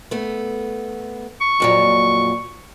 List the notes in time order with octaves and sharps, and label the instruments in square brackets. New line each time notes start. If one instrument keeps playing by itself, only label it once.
[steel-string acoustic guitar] A3 B3
[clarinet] C#6
[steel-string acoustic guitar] F2 A#2 F#3